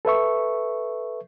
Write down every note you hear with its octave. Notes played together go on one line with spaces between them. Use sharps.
A4 B4 E5 C#6